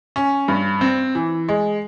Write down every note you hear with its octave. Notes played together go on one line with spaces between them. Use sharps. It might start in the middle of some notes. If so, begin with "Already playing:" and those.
C#4
G2
C4
E3
G#3